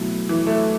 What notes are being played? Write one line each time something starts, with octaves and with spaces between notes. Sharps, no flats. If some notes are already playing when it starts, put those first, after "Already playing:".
Already playing: B2 F#3 A3 E4
E3
A3